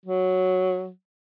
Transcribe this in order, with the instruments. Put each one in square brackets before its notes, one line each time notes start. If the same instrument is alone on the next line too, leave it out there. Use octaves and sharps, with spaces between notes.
[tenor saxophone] F#3